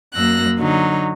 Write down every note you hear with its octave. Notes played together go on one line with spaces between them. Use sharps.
F#2 A#3 E6 F#6 A#6
D3 F#3 D#4